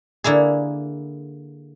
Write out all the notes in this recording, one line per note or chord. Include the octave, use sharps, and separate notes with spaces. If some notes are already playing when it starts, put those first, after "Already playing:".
D3 A#3 E4 G#4